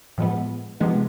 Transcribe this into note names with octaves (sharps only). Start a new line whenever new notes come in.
A2 F3 G#3 B3
C3 F3 G#3 B3 D#4